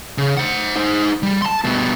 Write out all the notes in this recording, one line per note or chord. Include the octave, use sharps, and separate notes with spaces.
C#3
C5 F#5
D#4 C5
G3
A5 C6
G2 B2